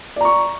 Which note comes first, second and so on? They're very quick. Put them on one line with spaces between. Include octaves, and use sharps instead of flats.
D5 A#5 C#6